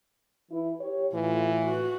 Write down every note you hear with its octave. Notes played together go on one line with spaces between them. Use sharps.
E3 E4
G4 C#5
A2 E3 F4
F#4